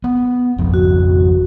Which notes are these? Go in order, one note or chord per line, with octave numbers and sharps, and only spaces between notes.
B3
G#1 F2
F#4